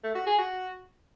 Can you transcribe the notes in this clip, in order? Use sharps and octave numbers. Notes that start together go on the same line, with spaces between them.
A3
F#4
G#4
F#4